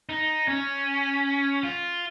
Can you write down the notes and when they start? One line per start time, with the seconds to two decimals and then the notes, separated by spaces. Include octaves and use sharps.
0.09 D#4
0.48 C#4
1.63 F4